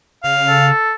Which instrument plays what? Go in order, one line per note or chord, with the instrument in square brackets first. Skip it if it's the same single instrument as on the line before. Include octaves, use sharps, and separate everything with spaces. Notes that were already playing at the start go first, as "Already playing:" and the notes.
[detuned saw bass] C#3 [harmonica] F5
[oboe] A4